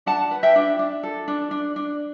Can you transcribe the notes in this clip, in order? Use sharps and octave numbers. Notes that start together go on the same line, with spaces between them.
D4 F#5 A5
B4
E5 G5
D4
D4
A4
D4
D4
D4